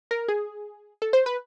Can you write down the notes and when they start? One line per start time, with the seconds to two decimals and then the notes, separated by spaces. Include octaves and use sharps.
0.11 A#4
0.28 G#4
1.02 A4
1.13 C5
1.26 B4